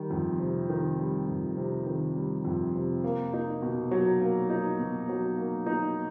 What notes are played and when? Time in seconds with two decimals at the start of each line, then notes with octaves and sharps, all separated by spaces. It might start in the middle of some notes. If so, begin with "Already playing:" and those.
Already playing: D#3 G3
0.10 F2
0.40 C3
0.69 D#3
0.99 G3
1.28 F2
1.57 C3
1.86 D#3
2.16 G3
2.45 F2
2.75 C3
3.04 A#3
3.33 D#4
3.62 B2
3.91 F#3
4.21 A#3
4.50 D#4
4.79 B2
5.09 F#3
5.37 A#3
5.66 D#4